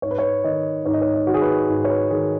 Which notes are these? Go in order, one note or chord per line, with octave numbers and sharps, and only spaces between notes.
G#2 C#5
B4
C#5
D#3 D#5
G#2 C#5
D#5
C#5
D#5
D#3 F#4
G#4
B4
G#2
C#5
B4
D#3 G#4